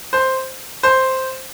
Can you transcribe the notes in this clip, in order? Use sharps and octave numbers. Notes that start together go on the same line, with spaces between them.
C5
C5